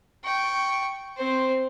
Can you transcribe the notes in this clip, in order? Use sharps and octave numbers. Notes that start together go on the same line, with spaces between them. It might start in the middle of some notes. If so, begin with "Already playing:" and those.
G5 C#6
C4 C5